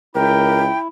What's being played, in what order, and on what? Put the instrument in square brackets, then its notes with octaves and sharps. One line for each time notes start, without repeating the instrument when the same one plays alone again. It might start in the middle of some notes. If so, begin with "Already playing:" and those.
[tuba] C#2 [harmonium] E4 [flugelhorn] A#4 [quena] G5